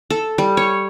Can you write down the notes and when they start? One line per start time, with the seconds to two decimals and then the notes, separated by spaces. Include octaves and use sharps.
0.10 A4
0.38 G3
0.57 C#5